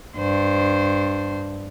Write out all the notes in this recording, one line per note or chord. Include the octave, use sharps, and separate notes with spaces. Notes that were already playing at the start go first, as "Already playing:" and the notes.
G2 C5